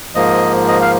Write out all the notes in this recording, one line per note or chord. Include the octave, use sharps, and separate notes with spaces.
G#2 F3 A#3 D#5
D#5
F5